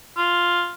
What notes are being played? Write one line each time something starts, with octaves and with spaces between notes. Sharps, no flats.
F4